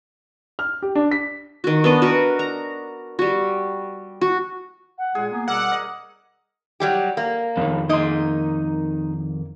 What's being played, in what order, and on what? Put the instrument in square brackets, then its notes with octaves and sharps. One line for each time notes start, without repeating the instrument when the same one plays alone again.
[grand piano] F6
G4
D4
B6
[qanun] D#3 F#4
B3 D4 D#5
F#4 A#4 B4
A#5
G3 F#4
F#4
[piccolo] F#5
[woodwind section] A#2 G#3 [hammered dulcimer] G#4
[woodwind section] A#3 B3 [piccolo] G#5
[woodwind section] B2 G3 E6 [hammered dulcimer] A#4 [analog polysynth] F#5 [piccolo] D6
[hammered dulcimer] D#5
[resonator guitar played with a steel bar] F#3 G3 G4
A#3
[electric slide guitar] F2 D#3 [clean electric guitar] B2 F3 B3
[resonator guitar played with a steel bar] A#3 D#5 [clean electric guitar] D#4 C6